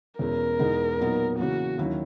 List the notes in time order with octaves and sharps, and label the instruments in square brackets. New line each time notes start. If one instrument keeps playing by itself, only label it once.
[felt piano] E2 B2 G#3 C#4 E4 [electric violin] A#4
[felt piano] E2 B2 G#3 B3 D#4
A#2 F#3 B3 D#4
[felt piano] C#3 E3 A#3 [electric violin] F#4
[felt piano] D#2 D#3 F#3 C#4 E4